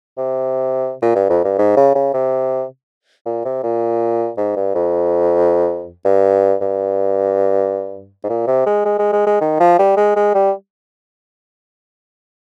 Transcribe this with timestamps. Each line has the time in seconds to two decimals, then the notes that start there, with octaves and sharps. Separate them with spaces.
0.18 C3
1.02 A#2
1.15 G2
1.29 F2
1.44 G2
1.58 G#2
1.77 C#3
1.95 C#3
2.14 C3
3.26 A#2
3.45 C3
3.63 A#2
4.37 G#2
4.56 G2
4.75 F2
6.05 G2
6.61 G2
8.24 G#2
8.29 A#2
8.47 C3
8.66 G#3
8.85 G#3
8.99 G#3
9.13 G#3
9.27 G#3
9.41 D#3
9.60 F3
9.79 G3
9.97 G#3
10.16 G#3
10.34 G3